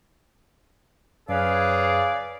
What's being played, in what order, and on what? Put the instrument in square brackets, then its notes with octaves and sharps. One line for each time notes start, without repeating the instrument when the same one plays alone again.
[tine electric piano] F#2 [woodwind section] C#3 B4 F5 [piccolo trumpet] G#4 [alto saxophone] D5